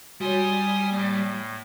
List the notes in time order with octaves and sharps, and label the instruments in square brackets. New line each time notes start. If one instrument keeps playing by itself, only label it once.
[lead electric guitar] G3 [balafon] F#4 C#5 [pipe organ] G#5 C6 D#6
[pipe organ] A2 [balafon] A#3 D5